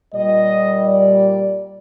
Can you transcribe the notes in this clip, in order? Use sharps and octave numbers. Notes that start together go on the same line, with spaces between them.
A#2 G3 D#5
D5